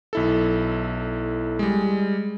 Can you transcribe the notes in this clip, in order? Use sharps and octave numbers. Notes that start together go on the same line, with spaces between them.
B1 E4 A4
G3 G#3